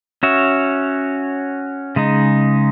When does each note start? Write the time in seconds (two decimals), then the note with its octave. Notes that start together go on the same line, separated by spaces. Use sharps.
0.23 C#4 F#4 C#5 E5
1.96 C#3 G#3 D#4